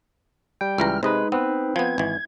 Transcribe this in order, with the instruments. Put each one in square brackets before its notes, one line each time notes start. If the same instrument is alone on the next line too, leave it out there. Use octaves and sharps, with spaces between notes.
[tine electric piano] G3 G5
[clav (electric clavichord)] C#2 E3 A#5 [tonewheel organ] F6
[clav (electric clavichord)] C3 D#5 [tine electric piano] G#3 B4 [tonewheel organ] D#4
[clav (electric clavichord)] B3 [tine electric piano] C4 B4
[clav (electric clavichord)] F3 B3 [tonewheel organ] G#6
[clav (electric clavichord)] G#1 E3